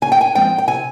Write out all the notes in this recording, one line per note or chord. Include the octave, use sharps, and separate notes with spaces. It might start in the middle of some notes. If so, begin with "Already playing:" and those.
C#3 G#5
G5
G#5
F3 G#3 C4 G5
G5
C3 G#5